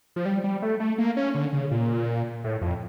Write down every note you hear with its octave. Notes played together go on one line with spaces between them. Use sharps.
F3
G3
G3
A3
A3
A#3
C#4
D3
C#3
A#2
A2
F2